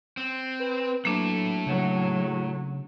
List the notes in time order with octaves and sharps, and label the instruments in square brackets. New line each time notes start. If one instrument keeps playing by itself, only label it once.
[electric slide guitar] C4
[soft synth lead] B4
[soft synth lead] F#3 [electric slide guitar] A3 E4 A4 [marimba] A#3 D4
[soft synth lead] C#3 [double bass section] F#3